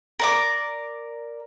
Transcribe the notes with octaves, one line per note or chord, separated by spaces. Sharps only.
A#4 D5 D6